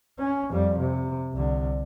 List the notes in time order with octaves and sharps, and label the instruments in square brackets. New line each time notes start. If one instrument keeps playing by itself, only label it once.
[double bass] C#4
F2 G3
C3
C2 D3